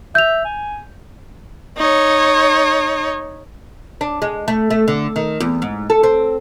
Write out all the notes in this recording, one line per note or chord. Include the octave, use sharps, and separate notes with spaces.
E5 G6 F7
G#5
D#4 C#5
D4
G#3
A3
A3
D3
D#3
E2
G#2
A4
C4